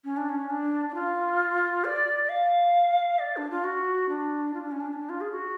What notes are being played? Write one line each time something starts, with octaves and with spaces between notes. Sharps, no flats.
C#4
D4
C#4
D4
D4
F4
D5
D5
F5
D5
D4
F4
F#4
D4
F4
D4
C#4
D4
C#4
D4
F4
G#4
F#4